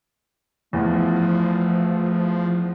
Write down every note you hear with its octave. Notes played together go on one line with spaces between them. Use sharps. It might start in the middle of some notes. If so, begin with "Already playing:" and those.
E2 F3 A3